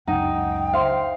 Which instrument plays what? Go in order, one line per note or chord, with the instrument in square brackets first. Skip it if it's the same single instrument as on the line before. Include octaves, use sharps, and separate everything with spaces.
[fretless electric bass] C#2 F#2 [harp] D#4 [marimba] F#5 [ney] G5
[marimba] C5 E5 C6 [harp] F5